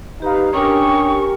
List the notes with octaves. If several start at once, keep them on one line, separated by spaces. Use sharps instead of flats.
D#4 G4 B4 F5
C#4 D4 G4 A#4 G5 C#6 D#6